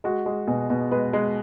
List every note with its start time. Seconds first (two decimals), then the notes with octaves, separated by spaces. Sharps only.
0.04 G#3 F#4
0.26 G#3
0.48 B2 G#4
0.70 B2
0.91 G#3 B4
1.13 G#3